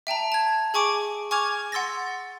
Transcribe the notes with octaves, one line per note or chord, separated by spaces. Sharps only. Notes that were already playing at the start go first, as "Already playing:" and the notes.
E5 G5 A5 A#5
A5 G#6
G#4 G#5 C#6 D6 D7
G#5 C#6 D6 F6 G#6 F7
F#5 C6 E6 A6 A#6